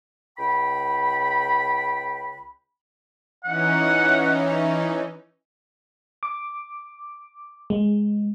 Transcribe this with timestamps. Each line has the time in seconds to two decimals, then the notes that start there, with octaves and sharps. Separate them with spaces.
0.38 C#2 G5 B5
3.44 E3 C#4 D#4 F#5
6.23 D6
7.70 G#3